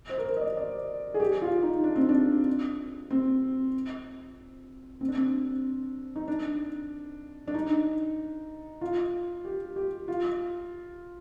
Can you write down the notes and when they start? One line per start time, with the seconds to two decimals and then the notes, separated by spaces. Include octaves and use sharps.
0.09 C5
0.18 A#4
0.25 C5
0.37 D#5
0.41 D5
0.57 D5
1.14 G#4
1.20 G4
1.42 F4
1.63 D#4
1.84 D4
1.96 C4
2.09 D4
3.11 C4
5.01 C4
5.08 D4
5.16 C4
6.16 D#4
6.28 D4
7.48 D4
7.54 D#4
8.81 F4
9.45 G4
9.76 G4
10.08 F4